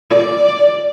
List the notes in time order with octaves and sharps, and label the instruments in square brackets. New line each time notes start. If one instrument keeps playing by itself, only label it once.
[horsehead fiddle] D5